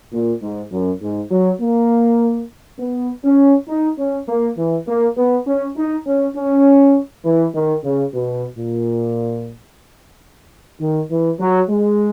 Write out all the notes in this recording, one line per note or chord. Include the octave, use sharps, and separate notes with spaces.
A#2
G#2
F#2
G#2
F#3
A#3
B3
C#4
D#4
C#4
A#3
E3
A#3
B3
C#4
D#4
C#4
C#4
E3
D#3
C#3
B2
A#2
D#3
E3
F#3
G#3